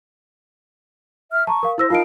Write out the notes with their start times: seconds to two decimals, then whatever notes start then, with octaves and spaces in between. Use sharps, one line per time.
1.32 E5 F6
1.47 A5 A#5 C#6
1.63 A#4 F5
1.78 E4 C5 E6 A#6
1.90 D#4 F4 A#4 F5 A5 D7